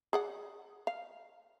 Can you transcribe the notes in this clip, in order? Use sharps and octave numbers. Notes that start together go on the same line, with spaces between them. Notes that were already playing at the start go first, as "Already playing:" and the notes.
G#4 D5 F#5
F5